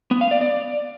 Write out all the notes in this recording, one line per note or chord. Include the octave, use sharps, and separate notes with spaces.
B3
F5
D5
D5